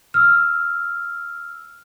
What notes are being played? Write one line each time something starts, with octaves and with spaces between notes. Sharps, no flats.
E6 F6